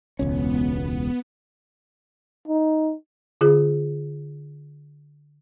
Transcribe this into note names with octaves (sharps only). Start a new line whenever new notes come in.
E1 C#2 B3 C#4
D#4
D3 F4 G#4